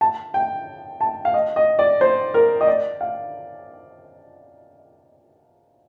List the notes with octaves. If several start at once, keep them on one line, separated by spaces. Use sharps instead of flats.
A5
G5
A5
F5
D#5
D#5
D5
C5
A#4
D#5
D5
F5